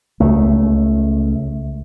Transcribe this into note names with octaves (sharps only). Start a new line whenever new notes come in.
C#2 A3